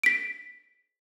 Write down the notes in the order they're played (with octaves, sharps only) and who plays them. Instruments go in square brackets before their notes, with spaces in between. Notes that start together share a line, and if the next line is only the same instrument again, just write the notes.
[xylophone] B6 D7